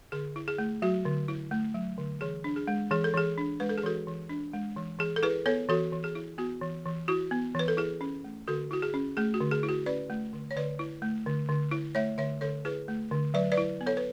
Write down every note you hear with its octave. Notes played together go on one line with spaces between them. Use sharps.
D3 G#4
E4
G#4
A3
F#3 F#4
D3
E4
A3
F#3
D3
E3 G#4
D4
G#4
G#3
E3 G#4
A4
E3 G#4
D4
G#3 B4
A4
G#4
E3 F#4 A4
E3
D4
G#3
E3
E3 G#4
A4
E4 G#4 B4
B3 A4 C#5
E3 F#4 A4
E3
G#4
E4
B3 F#4
E3
E3
E4 F#4
B3
E3 B4
A4
E4 G#4
C#4
A3
D3 F#4 A4
E4 F#4
G#4
C#4
A3 G#4
F#4
D3
G#4
E4
F#4
C#4 B4 D5
A3
D3
C#5
D3 B4 D5
E4
A3
D3
D3
E4
A3 C#5 E5
D3 C#5 E5
D3 A4 C#5
E4 G#4 B4
A3
D3
F#3 B4 D5
B4 D5
E4
B3
A4 C#5
B4